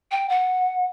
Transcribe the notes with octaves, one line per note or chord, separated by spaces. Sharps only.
G5
F#5